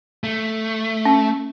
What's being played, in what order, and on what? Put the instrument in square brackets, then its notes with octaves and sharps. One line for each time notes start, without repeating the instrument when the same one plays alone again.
[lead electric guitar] A3
[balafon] C#4